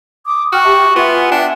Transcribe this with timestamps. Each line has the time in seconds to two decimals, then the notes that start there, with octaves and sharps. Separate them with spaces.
0.26 D6 D#6
0.53 F#4 G5 F6
0.64 G4 E5 A5
0.96 B3 F4 E5 F#5 G#5
1.32 D4 G5